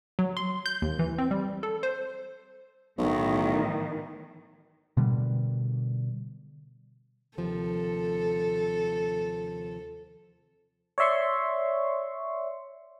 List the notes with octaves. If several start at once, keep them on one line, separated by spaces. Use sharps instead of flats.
F#3
C6
G6
D#2
E3
C4
G3
A4
C5
B1 A2 D#3 E3
B2 D3 G3
D#2 C3 F3 A4
C#5 D5 E5 C6 C#6